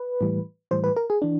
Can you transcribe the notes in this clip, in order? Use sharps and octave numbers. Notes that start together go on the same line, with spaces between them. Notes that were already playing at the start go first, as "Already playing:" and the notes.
Already playing: B4
A2 E3 G3
A2 E3 G3 C5
B4
A#4
G#4
E3 D4